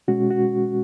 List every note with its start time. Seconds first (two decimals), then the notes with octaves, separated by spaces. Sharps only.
0.08 B2 G#3 C#4 F#4
0.31 F#4